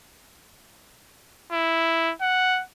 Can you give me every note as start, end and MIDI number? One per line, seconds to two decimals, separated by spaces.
1.52 2.13 64
2.21 2.62 78